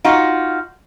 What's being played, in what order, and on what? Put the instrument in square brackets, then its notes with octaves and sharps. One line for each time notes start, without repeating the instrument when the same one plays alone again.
[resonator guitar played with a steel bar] D#4 F4 F#4